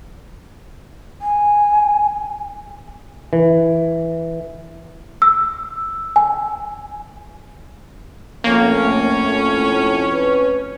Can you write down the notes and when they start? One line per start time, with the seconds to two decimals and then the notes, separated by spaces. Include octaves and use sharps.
1.22 G#5
3.33 E3
5.22 E6
6.16 G#5
8.44 F2 A2 A3 A#3 C#4
10.12 B4